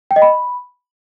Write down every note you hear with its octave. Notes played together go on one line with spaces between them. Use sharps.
G5
D#5
B5